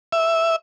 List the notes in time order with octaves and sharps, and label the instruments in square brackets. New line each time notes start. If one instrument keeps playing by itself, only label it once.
[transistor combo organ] E5